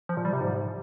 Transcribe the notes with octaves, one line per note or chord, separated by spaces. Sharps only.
F3
A#2
G3
C3
G#2